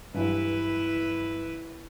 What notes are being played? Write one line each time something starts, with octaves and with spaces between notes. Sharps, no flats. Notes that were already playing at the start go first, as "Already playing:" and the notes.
G2 E3 F#3 E4 B4